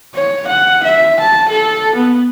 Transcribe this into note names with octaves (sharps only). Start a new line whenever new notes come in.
C#5
F#5
E5
A5
A4
B3